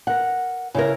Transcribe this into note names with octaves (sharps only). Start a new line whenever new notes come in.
A#4 F#5
C#3 E4 A#4